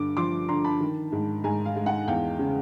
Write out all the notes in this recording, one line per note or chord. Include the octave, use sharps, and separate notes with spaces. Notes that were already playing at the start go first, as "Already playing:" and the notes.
Already playing: G2 D3 D6
F3 C6 D6
D3 A#5 C6
A5 B5
D#3
G#2
G#2 G#5 A#5
F5
G#3
F#5
E2 F5 G5
C#3